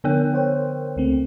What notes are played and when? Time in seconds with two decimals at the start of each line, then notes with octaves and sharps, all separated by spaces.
0.04 D3 B3 A#4
0.34 C5 C#5 G5
0.96 C#2 A3 C4